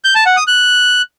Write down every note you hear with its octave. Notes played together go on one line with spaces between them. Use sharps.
G6
A5
F#5
D#6
F#6